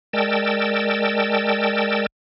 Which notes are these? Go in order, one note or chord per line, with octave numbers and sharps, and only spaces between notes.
G#3 A#4 D5 G5 A5 E6